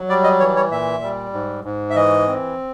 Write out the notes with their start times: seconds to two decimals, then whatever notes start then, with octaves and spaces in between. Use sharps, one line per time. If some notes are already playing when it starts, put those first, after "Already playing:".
Already playing: F#3
0.09 G3 D5
0.24 D#5
0.40 E3 C#5
0.56 C#5
0.71 A#2 E5
1.03 G3
1.33 G#2
1.65 G#2
1.90 E5
1.96 E3 D#5
2.27 C4